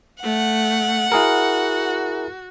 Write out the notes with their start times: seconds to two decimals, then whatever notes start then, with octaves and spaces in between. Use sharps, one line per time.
0.23 A3 F#5
1.12 E4 F#4 G#4 A#4